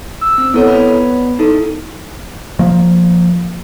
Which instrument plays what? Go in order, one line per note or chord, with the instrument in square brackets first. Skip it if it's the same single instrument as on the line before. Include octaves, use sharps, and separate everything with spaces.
[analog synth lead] E6
[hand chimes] C4
[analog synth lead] B3 [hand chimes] E4 A4 C#5
[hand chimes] D5 B5
D#4 E4 A4
[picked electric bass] F3 A#3